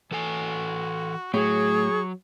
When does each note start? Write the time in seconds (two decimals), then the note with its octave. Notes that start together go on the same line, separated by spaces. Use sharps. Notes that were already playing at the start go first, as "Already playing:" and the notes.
0.11 E3 F#4 A4 G#5
1.34 A2 F#3 G#4 C#6